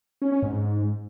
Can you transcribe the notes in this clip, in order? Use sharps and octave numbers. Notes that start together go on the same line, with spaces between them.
C#4
C#4
G#2